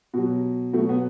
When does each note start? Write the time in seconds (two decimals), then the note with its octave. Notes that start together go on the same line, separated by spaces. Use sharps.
0.13 B2 F#3
0.73 B2 F#3 A3
0.89 B3